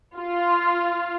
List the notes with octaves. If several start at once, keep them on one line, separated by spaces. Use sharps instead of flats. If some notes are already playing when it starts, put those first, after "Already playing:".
F4